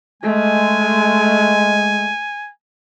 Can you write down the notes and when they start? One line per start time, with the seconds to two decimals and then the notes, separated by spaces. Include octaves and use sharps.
0.23 G#3 A3 G#5